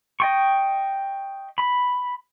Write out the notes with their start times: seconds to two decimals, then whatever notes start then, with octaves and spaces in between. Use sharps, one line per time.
0.20 D#5 G5 C#6
1.58 B5